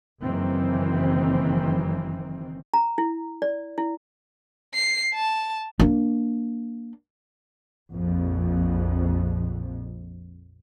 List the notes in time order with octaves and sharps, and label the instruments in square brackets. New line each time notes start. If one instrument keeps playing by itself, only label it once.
[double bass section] F#1 F#2 D#3 E3 C4
[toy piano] A#5
E4
D5
E4
[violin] C7
A5
[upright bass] A#3 D4
[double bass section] A#1 F2